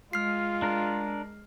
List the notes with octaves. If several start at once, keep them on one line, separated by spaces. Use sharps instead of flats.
G#3 F4 F6 C7
D4 A#4